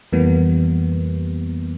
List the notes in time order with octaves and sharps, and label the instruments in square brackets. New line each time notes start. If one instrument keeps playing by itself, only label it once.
[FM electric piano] F2 E3 G3 A#3 B3